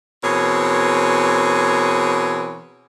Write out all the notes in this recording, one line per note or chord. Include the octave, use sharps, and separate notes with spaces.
B2 E3 C4 G#4 A#4 C#5